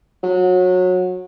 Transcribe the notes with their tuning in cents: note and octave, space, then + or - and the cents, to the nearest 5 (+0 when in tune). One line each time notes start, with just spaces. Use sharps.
F#3 -25